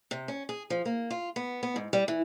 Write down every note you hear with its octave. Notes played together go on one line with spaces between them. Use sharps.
C3
C#4
G#4
F3
A#3
F4
B3
B3
G#2
G3
E3